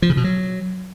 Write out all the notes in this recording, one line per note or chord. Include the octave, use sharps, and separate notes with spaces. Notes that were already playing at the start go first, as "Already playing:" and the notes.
F3
C#3
B2
F#3